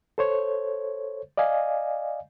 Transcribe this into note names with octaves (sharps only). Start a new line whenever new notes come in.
A4 C5 C#5
D5 D#5 F5 G#5